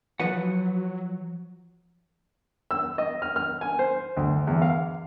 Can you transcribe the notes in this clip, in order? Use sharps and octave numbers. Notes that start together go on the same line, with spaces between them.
F3 F#3 B4 F#5
E6
D#5
F6
F6
G#5
C5
D2
E2
F5